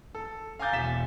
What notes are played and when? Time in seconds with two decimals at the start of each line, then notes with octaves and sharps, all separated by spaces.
0.15 A4
0.59 F5 G#5 A#5 D6 G6 A6
0.73 E1 G#5 B6 E7